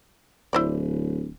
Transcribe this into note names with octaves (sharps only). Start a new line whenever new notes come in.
D1 E4 C5 D5